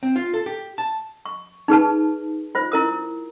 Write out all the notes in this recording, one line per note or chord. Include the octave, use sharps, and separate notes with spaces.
C4
F4
A4
G4
A5
C#6
D#4 G#4 B4 A5
F4 C5
E4 A#4 D#6